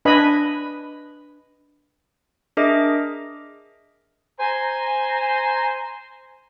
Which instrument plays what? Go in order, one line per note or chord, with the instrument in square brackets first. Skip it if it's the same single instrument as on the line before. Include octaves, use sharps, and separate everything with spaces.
[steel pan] D4 B4 D#5 G#5 B5
[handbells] D4 G#4 A#4 D#5 E5 D6
[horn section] C5 G#5 A#5